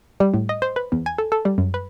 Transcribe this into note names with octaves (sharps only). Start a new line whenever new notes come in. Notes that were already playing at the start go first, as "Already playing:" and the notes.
G3
A2
D#5
C5
B4
E2
G#5
A4
A4
G3
F#2
B4